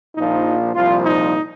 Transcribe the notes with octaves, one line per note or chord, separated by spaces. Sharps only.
A#1 A#2 F3 D#4
C2 A#2 F3 F4
D#4